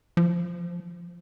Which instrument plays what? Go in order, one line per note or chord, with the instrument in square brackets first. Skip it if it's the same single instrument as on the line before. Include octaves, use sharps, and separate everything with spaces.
[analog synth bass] F3